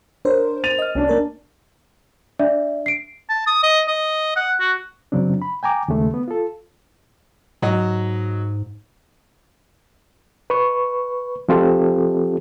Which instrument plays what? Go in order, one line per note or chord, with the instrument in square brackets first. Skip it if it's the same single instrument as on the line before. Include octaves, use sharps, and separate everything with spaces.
[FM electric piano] D4 A#4 C5 [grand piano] C#5
[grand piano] A6 D#7 F7
[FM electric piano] D#5 F6
[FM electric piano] C2 [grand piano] C#4 D4
[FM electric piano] A#3 A#4 C#5
[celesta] D4 D5 E5
C7 D7
[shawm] A5
D#6
D#5
D#5
F#5
F#4
[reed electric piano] F#2 C#3 F#3 C4 D4
B5
G5 G#5 A#5 D6
D#2 C#3 G#3 A3
B3
F4 A4
[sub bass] G#2 [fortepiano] F#3 D#5
[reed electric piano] B4 C#6
F3 C4 F4 G4 A4